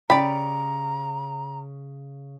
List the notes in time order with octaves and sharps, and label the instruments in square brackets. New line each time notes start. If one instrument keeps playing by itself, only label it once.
[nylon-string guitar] C#3 [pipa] G4 D5 [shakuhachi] A#5 [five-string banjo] B5